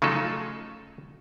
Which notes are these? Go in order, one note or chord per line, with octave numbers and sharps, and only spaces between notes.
C#3 F3 F#3 A3 D#4 A4